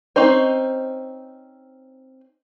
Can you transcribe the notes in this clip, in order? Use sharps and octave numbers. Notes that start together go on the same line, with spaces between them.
C4 C#4 D#4 C5